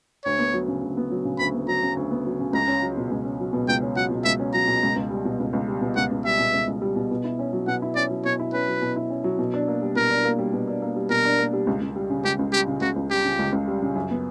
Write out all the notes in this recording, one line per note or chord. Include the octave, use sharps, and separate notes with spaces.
D2 C#5
B3
F#3
C#3
D2
B3
F#3
C#3
D2 B5
B3
F#3 A#5
C#3
D2
B3
F#3
C#3
C#2 A#5
C#4
F#3
B2
C#2
C#4
F#3
B2
C#2 G5
C#4
F#3 F#5
B2
C#2 E5
C#4
F#3 A#5
B2
C#2
C#2
G3
B2
C#2
C#2
G3
B2
C#2 F#5
C#2
G3 E5
B2
C#2
C#2
G3
B2
B2
E4
C#4
F#3
B2 F#5
E4
C#4 D5
F#3
B2 C#5
E4
C#4 B4
F#3
B2
E4
C#4
F#3
B2
D4
A#3
G3
B2 A#4
D4
A#3
G3
B2
D4
A#3
G3
B2 A#4
D4
A#3
G3
C#2
C#2
G3
C#3
C#2 G4
C#2
G3 G4
C#3
C#2 F#4
C#2
G3 G4
C#3
C#2
C#2
G3
C#3
F#2
B3